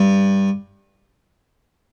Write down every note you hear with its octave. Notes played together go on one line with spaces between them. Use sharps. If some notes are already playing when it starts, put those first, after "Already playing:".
Already playing: G2